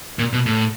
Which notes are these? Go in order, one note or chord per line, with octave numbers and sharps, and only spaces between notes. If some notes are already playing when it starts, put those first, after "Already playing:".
A#2
B2
A2